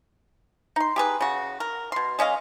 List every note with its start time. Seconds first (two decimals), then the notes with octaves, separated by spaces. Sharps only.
0.76 D#4 C6
0.96 G4 G#4 B4
1.21 C#3 F#4
1.60 A#4
1.92 B2 C6
2.19 G#3 C#4 D#5 F5